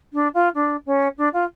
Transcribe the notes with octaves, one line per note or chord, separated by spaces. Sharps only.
D4
F4
D4
C#4
D4
F4